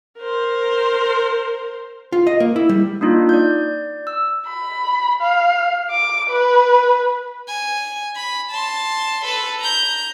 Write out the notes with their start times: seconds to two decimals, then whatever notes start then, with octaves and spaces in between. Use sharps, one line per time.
0.18 A#4 C5
2.12 F4
2.27 D#5
2.40 A#3
2.56 E4
2.69 G3
3.01 A#3 D4 D#4 F4
3.29 D5 G6
4.07 E6
4.47 B5
5.21 F5
5.91 D6
6.30 B4
7.48 G#5
8.16 B5
8.51 A5 C6
9.25 A4 B4
9.59 A#5 G6